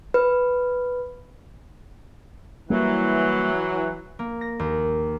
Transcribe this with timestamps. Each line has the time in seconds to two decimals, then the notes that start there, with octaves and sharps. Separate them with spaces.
0.14 B4
2.70 E3 F#3 G3 A#3
4.19 A#3
4.41 A#6
4.59 D#2